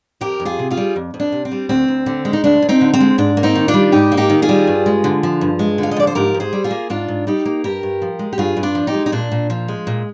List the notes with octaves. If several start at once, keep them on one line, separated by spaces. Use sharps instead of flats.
F2 G4 A#4
F2
F4 G#4
C3
F4 G#4
G3
F2
F2
D4
C3
C4
G3
D2 C4
D2
D3
G#3
D#4
D2 D4
D2
C4 D#4
D3
C4
G#3
G#2 D4
A#3
C4 D#4
D#3
D4 F4
G3
G#2 D#4 G4
A#3
D#4 G4
D#3
F4 G#4
G3
G2
G#3
D3
F3
G2
G#3
D3 F5
D#5
F3 D5
C5
G#2 G4 A#4
G#2
G#4 C5
G3
F4 G#4
A#3
G#2 D4 F4
G#2
G3 D#4 G4
A#3
G2 G4 A#4
G2
F3
G#3
G4
G2 F4 G#4
G2
D4 F4
F3
D#4 G4
G#3
D#4
A#2 D4
A#2
F3
G#3
A#2